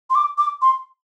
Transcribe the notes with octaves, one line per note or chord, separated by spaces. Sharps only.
C6
D6
D6
C6